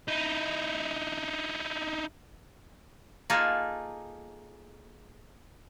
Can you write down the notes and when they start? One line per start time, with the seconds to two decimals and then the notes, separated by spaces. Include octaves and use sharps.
0.08 D#4 E4
3.30 A#3 D#4 F4 G#4 A4